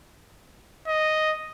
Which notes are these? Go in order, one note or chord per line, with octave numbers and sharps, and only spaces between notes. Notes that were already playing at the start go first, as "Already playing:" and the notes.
D#5